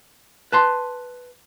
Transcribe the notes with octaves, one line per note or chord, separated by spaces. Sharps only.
B4 A5 C6